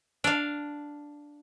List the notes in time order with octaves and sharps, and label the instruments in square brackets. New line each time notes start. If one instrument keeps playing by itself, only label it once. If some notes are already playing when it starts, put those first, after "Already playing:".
[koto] D4 F5